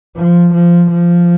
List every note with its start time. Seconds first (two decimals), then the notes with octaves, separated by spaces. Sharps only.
0.16 F3
0.54 F3
0.91 F3